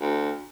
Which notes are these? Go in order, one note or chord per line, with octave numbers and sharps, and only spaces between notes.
D2